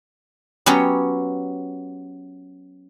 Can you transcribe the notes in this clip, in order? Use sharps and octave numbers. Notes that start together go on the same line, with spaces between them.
F#3 B3 C#4 G4 C#5